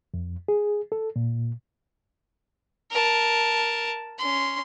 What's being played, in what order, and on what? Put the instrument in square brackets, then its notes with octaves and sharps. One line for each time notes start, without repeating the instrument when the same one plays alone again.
[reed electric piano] F2
G#4
A4
A#2
[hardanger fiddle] A#4 A5
C#4 C6